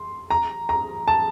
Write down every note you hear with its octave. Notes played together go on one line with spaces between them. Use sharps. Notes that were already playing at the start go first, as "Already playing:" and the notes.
Already playing: C6
A#5
A#5
A5